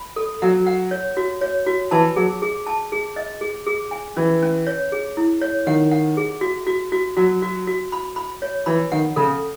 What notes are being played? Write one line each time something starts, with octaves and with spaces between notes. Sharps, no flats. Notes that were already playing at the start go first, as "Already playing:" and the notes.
Already playing: B5
A4
F#3 F#5
F#5
C#5
F#4
C#5
F#4
E3 A5
F#3 G#4
G#4
A5
G#4
D#5
G#4
G#4
G#5
E3 C#4
C#4
C#5
G#4
E4
C#5
D#3 F#5
F#5
G#4
F#4
F#4
F#4
F#3 F#4
F#4
F#4
B5
B5
C#5
E3 B5
D#3 F#5
C#3 A4